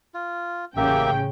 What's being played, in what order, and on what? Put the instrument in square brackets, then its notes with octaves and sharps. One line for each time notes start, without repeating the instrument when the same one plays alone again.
[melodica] F4
[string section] A1 C#3 G5 [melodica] A#3 G4 E5